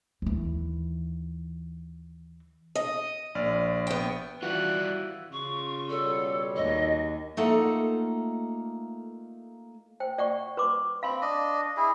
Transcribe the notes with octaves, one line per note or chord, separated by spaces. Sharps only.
D#2 E3
D#5
A#1 D5 F6
B3 G5
E3 G3 F4 F#4 F#6
C#3 F4 C#6
B2 G3 A4 C#5
D#2 D#5
A3 A#3 D#4 F4 A4 F#5
C5 G5
D5 F#5 C#6
B4 C6 D6
C4 F5 B5 C6
D4 D#5
E4 G#4